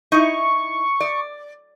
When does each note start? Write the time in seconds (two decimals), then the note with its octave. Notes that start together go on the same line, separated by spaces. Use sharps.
0.12 D#4 E4 C#6
1.00 D5